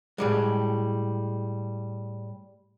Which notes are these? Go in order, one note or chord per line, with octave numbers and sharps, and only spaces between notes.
A2 G3 G#3